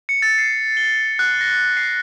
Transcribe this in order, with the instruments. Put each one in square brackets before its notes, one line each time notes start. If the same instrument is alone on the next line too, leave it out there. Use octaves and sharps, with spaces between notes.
[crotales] C#7
A6
C7
G7
F#6
A#6
C7